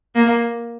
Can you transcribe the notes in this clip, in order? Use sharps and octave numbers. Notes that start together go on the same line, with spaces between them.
A#3